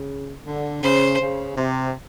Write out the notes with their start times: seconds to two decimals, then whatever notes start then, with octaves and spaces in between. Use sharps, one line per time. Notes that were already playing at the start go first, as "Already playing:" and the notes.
Already playing: C#3
0.45 D3
0.82 C#3 C5
1.20 C#3
1.57 C3